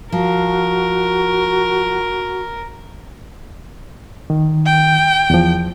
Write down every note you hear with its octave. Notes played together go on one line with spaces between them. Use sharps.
F3 F#4 A#4
D#3
G5
E2 F3